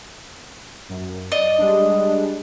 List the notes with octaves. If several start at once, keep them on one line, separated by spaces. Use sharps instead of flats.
F#2
D5 D#5
G3 G#3 D4